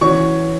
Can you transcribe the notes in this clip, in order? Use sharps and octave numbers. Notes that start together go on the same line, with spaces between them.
E3 C#4 F#4 C#6